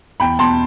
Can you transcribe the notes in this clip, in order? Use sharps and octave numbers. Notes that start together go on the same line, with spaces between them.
E2 G5 B5
B2 A5 C6